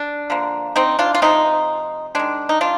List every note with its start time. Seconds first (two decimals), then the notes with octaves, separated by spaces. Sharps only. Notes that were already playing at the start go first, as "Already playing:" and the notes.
Already playing: D4
0.30 D3 F3 A#3
0.76 C4 D#4
0.99 D4 F4
1.15 F4
1.22 C3 F3 G#3 C4 D#4
2.15 D#3 G#3 D4
2.49 D#4
2.61 D4 F4